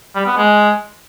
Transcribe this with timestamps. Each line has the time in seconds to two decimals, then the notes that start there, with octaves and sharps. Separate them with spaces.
0.15 G3
0.26 B3
0.37 G#3